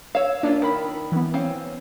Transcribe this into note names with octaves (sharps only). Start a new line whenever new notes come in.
C#5 F5 E6
A#3 C#4 D4 F4
D#3 A#4 B5
E3 B3
C4 C#4 F5